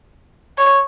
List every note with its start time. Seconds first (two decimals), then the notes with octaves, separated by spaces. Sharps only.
0.58 C#5